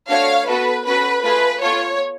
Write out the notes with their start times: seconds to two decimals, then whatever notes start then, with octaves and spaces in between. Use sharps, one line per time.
0.09 A3 D4 F#4 C#5 F5
0.47 B3 F#4 A4 B4
0.86 C#4 F#4 A4 B4
1.24 A3 F4 G#4 B4
1.61 B3 F4 A4 C#5